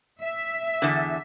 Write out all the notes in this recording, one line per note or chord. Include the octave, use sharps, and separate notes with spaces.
E5
E2 D3